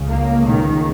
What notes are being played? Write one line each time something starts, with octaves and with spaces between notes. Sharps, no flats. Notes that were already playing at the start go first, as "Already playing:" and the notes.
Already playing: C#2 C#3
A#3
D#3